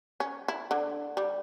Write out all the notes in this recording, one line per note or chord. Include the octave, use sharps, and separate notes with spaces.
C#4
E4
D3
G3